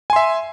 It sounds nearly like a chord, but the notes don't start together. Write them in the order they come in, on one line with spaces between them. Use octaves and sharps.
G#5 C6 E5